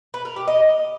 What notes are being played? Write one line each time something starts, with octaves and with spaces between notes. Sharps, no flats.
B4
A#4
G4
D#5